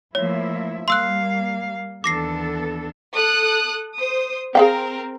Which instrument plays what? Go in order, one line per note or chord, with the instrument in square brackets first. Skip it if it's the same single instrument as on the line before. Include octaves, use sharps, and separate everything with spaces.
[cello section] F3 E4 E5 [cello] A3 A#3 [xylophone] C#5
[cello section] G3 A#3 [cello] F5 [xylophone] C6 E6 F#6
[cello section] D#2 B3 A4 [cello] E3 D4 [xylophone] D6 A#6 C7
[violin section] A4 D#6 F#6
C5 D#6
[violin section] C4 A#4 [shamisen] G#4 F5 G5